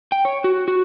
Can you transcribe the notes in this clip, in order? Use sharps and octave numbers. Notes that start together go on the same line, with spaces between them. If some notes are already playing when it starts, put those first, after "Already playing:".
G5
C#5
F#4
F#4